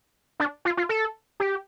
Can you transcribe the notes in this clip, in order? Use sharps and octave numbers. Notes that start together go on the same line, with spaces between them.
D4
F4
F4
A4
G4